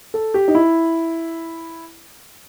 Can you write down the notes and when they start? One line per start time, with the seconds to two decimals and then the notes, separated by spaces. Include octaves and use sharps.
0.14 A4
0.34 G4
0.48 D#4
0.55 E4